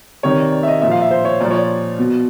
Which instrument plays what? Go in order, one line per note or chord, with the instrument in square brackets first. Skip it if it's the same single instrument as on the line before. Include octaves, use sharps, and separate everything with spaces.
[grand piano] C3 D#3 C#5
D5
D5
E5
D#5
A#2 F3 E5
F5
E5
C5
C#5
A#2 F3 D5
C#5
D5
B2